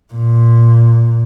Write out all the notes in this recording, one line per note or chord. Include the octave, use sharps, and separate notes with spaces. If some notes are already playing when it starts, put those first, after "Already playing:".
A#2